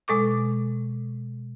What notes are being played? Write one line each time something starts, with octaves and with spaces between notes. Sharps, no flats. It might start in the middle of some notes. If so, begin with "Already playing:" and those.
B2 G#3 A4 C#6 D6